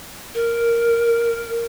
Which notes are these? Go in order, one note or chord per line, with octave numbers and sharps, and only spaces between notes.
A#4